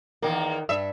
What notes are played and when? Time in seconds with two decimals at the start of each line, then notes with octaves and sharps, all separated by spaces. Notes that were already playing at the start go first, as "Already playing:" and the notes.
0.22 E2 D#3 A#3 A#4
0.69 G2 E5